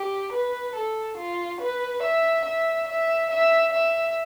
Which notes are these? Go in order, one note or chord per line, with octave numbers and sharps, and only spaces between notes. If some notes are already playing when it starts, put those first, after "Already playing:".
Already playing: G4
B4
A4
F4
B4
E5
E5
E5
E5
E5